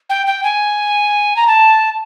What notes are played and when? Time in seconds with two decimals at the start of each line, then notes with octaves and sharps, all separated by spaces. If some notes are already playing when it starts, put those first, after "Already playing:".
0.10 G5
0.27 G5
0.44 G#5
1.36 A#5
1.47 A5